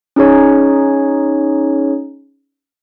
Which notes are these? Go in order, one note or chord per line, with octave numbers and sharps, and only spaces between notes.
C#4 D#4 G#4 C#5